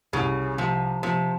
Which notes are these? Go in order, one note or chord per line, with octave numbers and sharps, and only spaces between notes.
C2 C#3
C3 F3
C3 F3